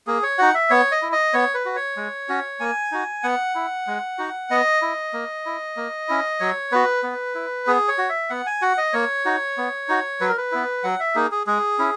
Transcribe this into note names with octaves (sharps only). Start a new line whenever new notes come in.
A#3 G#4
C#5
D#4 F#4 F#5
E5
B3 C#5
D#5
E4
D#5
B3 C#5
B4
F#4
C#5
G#3
C#4 F#4
A#3 G#5
D#4 F#4
B3 F#5
E4
G#3
D#4 F#4
B3 D#5
E4
A#3
E4
A#3
C#4 E4
F#3 C#5
B3 F#4 B4
B3
E4
B3 G#4
C#5
F#4
E5
B3 F#5
G#5
F#4 F#5
D#5
A#3 C#5
D#4 F#4
B3
D#4 F#4
F#3 B4
A#4
B4
B3 E4
F#3 F#5
E5
A#3 D#4 G#4
G#4
G#3 G#4
C#4 E4